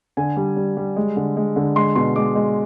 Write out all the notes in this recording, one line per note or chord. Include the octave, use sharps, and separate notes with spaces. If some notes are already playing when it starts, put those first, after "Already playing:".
D3 G#5
G3
G3
G3
G#3
D3
G#3
D3
G#3 C6
B2 C6
G#3 D6
G#3